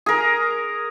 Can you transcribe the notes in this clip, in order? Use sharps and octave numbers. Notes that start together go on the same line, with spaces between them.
G#4 A#4